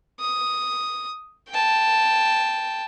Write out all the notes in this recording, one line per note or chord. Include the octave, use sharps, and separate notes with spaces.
D#6
G5 A5